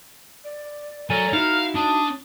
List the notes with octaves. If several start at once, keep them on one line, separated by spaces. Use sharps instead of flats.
D5
F#3 A4 A#4 D5 G#5
D#4 E4 F#4 F5 F6
D4 A5 D#6